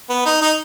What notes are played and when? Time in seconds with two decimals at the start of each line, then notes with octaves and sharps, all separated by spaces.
0.09 B3
0.25 D#4
0.41 D#4